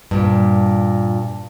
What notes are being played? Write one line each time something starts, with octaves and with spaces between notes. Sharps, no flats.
G2 A#2